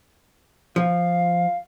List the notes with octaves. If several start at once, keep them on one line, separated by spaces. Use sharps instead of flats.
F3 F5